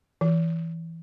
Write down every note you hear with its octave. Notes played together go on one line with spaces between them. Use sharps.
E3